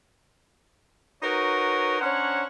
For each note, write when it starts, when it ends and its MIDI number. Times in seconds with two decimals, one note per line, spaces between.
1.23 1.99 63
1.23 1.99 66
1.23 1.99 70
1.23 1.99 71
1.23 1.99 73
2.01 2.44 61
2.01 2.44 62
2.01 2.44 72
2.01 2.44 73
2.01 2.44 78
2.01 2.44 82